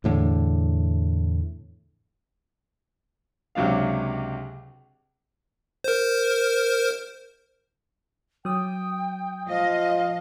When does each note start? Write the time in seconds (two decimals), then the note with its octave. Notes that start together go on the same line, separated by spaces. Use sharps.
0.04 E2 A2 D3
3.55 C#2 C3 F#3 D4 F5
5.84 A#4 C5
8.45 F#3 G5 D#6
9.48 F3 D#5 F5